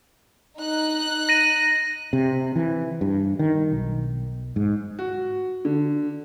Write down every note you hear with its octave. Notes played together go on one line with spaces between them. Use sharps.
D#4 F#6
A#6 D#7
C3
E3
G2
D#3
B1
G#2
F#4
D3